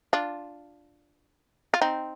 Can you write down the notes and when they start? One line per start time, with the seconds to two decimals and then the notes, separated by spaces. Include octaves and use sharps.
0.13 D4 F4
1.74 F4
1.81 C4 D#4